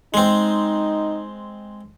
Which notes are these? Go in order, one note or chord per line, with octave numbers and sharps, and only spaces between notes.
G#3 C4 D#4